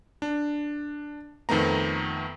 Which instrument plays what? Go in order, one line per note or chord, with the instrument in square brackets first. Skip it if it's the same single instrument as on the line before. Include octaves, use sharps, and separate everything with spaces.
[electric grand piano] D4
F2 D#3 A3 B3 A#5